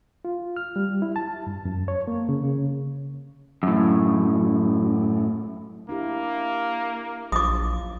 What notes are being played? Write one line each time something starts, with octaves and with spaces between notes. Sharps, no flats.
F4
F6
G3
E4
A5
G2
F#2
C#5
A#3
C#3
C#3
F#2 A2
A#3 D4 E4 G4
A#1 F#3 F4 D6 D#6